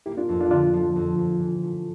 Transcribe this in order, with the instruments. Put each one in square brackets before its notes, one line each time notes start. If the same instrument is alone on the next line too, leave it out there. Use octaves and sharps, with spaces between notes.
[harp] A#3 [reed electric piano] E4 G4
[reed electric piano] D4 F4
[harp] F2
[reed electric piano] D4 F4
[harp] D3 [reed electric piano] D4 F4
[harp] F3
F2
F2
E3
A3